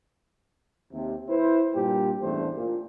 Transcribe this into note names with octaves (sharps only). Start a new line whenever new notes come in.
D#2 C3
E4 B4 C5
G2 A#2 G4
A1 E2 G2 A3 D4 C5
A#2